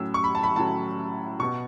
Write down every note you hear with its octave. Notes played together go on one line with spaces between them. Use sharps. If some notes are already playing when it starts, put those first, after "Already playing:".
Already playing: A2 F#3 C#4 E6
C#6
B5
A5
B5
A2 F#3 C#4 A5
B2 B3 C#6